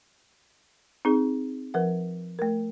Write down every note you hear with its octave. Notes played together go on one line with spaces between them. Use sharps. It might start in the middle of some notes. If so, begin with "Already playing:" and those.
C4 D#4 G#4
F3 A#4 B4 F#5
A3 A#4